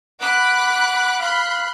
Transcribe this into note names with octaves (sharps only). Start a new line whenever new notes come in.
F#5 B5 D6 F#6
F5 B5 C6 F#6